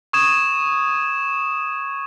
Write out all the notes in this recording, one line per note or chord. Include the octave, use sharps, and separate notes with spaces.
C#6 D#6 G#6 E7